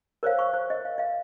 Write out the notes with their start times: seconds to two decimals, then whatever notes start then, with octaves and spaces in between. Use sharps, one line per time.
0.23 A#4 C5 C#5 F5
0.39 C#6
0.53 C5
0.70 D#5
0.85 F5
0.98 D#5 F5